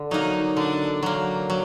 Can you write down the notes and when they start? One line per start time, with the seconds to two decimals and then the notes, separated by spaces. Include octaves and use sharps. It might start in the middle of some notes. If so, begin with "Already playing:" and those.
Already playing: D3
0.11 F#3 A#3 D#4
0.57 D3 D4
1.03 F#3 A#3
1.50 F#3